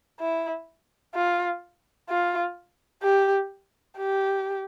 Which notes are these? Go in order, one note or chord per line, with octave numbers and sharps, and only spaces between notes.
E4
F4
F4
G4
G4